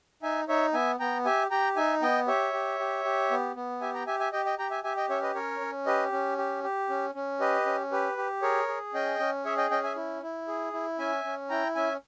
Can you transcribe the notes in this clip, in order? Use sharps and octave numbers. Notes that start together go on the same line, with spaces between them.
D#4 E5 G#5
D#4 C#5 E5
B3 E5 G#5
B3 G5 A#5
G4 E5 G#5
G4 G5 A#5
D#4 E5 G#5
B3 D#5 G5
G4 C#5 E5
G4
G4
G4
B3
B3
G4 E5 G#5
G5 A#5
G4 E5 G#5
E5 G#5
G4 D#5 G5
D#5 G5
G4 G5 A#5
E5 G#5
G4 E5 G#5
D#5 G5
C#4 C#5 E5
B4 D#5
C#4 A#4 C#5
C#4
G4 B4 D#5
C#4
G4
G4
C#4
C#4
G4 B4 D#5
C#4
G4 B4
G4
G#4 A#4 C#5
G#4
C#4 D#5 G5
C#4
G#4 C#5 E5
D#5 G5
C#4 D#5 G5
E5 G#5
E4
E4
G#4
E4
C#4 E5 G#5
C#4
E4 G5 A#5
C#4 E5 G#5